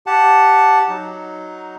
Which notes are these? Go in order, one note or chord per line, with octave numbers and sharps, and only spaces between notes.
G4 F#5 A5
F#3 D#4